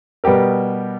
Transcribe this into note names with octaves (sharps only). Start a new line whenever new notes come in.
B2 G3 B3 G4 A#4